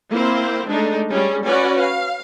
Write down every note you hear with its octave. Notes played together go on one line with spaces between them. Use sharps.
A#3 C4 E4 C5
G#3 A3 D4 D#4
G3 C#4 G#4
C#4 F#4 B4 D5
F5